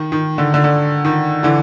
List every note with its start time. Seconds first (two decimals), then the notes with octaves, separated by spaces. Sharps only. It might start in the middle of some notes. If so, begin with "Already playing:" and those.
Already playing: D#3
0.12 D#3
0.38 D3
0.54 D3
0.64 D3
1.05 D#3
1.43 D3 E3